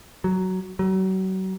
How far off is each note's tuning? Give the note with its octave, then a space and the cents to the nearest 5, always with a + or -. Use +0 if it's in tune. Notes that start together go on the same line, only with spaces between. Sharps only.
F#3 +10
F#3 +35